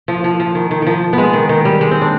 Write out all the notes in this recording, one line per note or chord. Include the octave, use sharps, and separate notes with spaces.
F3
F3
F3
D#3
D#3
D#3 F3
G#3 B3
D#3
D#3
G3
G#3
C4
D4